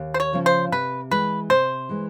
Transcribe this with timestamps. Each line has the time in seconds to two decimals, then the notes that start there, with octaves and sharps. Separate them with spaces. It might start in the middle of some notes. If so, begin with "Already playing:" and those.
Already playing: D#2
0.14 C5
0.20 C#5
0.33 C#3 F3 A#3 C#4
0.46 C5
0.72 C3 B4
1.11 E3 G#3 B4
1.50 C3 C5
1.89 E3 G#3